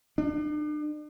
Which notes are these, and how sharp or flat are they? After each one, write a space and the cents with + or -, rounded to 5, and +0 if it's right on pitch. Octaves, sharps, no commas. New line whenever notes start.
D4 +40